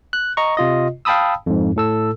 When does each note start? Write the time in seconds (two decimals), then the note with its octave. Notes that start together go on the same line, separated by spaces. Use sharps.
0.13 F#6
0.37 D#5 A#5 C#6
0.57 C3 F4 D#5
1.05 F5 G5 A5 B5 D#6 E6
1.46 F2 G#2
1.76 A2 A4 E6